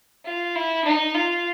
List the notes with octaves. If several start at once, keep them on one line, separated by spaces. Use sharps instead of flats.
F4
E4
D#4
F4